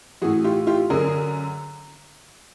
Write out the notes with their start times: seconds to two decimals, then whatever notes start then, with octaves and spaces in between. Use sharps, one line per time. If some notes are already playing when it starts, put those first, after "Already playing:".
0.22 A2 E3 F#4 G#4
0.44 F4 G4
0.67 F4 G4
0.90 F#2 D3 G#4 A#4